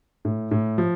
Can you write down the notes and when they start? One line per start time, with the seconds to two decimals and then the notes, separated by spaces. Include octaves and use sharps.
0.25 A2
0.51 A2
0.78 F3